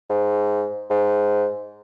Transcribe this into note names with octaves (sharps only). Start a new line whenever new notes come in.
G#2
G#2